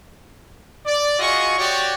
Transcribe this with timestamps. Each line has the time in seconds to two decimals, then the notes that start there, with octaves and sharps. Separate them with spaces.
0.86 D5
1.20 F4 F#4 G#4 D#5 C#6
1.59 F#4 G4 C#5 D5